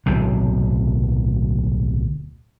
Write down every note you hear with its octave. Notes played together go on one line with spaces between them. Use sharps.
D1 B1 C3